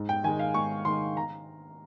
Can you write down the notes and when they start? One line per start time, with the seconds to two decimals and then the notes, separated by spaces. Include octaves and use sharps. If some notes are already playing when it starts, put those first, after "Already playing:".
Already playing: G#2
0.09 G5
0.24 D#3 G#5
0.28 G#3
0.39 F5
0.54 G#2 C#6
0.85 D#3 G#3 C6
1.17 A#5